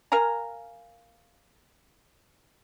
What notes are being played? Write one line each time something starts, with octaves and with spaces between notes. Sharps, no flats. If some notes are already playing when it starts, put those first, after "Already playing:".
A#4 F5 G#5 A#5